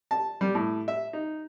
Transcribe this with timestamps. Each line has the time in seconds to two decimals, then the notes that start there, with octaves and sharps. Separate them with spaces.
0.11 A5
0.41 G3
0.55 A2
0.88 E5
1.13 D#4